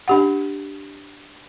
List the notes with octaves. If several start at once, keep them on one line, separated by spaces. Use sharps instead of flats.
D4 G4 F#5